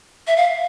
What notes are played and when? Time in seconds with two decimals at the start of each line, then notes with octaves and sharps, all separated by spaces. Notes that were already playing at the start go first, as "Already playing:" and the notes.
0.27 E5
0.37 F5